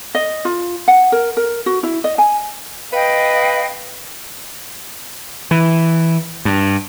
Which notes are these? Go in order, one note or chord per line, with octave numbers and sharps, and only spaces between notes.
D#5
F4
F#5
A#4
A#4
F#4
E4
D#5
G#5
B4 D#5 F5 G5
E3
G2